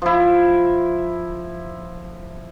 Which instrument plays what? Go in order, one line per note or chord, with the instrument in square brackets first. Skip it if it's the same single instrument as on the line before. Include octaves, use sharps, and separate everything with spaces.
[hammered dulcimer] F3 E4